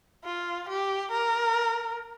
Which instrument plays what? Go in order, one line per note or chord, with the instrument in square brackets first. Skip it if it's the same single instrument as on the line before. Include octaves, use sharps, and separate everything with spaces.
[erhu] F4
G4
A#4